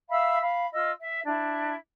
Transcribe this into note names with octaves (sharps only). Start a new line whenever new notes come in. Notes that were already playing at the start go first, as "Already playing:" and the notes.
E5 F5 B5 E6
F5 B5
F4 D#5 E6
E5
D4 E4